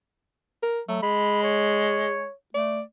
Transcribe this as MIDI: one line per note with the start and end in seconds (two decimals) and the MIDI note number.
0.63 0.80 70
0.88 0.99 54
0.88 1.02 57
1.02 2.27 56
1.02 1.40 83
1.43 2.32 73
2.54 2.82 57
2.54 2.81 74